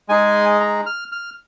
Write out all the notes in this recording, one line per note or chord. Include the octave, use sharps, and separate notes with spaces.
G#3 D#4 G#4 G#5
A#5
F6
F6